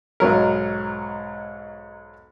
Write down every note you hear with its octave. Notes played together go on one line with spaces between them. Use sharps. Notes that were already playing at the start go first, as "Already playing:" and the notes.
B1 G#2 F#3 A#4